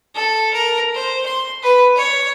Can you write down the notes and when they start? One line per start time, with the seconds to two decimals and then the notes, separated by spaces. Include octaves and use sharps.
0.14 A4
0.53 A#4
0.95 C5
1.26 C6
1.62 B4
1.96 C#5